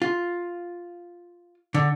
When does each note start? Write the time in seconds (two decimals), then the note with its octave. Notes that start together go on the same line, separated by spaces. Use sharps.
0.02 F4
1.74 D3